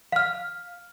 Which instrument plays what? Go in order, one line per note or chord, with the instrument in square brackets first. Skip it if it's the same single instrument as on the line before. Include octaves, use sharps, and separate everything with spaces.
[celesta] F5 F6